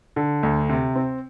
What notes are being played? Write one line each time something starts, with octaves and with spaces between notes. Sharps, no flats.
D3
D2
C3
C4